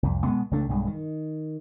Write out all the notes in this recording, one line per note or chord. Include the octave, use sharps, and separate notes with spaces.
C2 F2
B2 G#3 B3
C#2 A3 D4
B1 G2 G#3
D#3